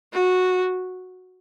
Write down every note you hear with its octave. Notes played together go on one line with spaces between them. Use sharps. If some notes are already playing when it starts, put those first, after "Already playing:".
F#4